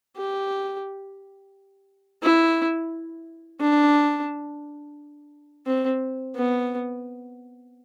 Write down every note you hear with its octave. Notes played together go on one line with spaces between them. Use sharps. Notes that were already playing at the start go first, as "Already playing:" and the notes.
G4
E4
D4
C4
B3